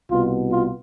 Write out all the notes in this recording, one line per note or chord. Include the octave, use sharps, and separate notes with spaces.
C2 B2 F4
F4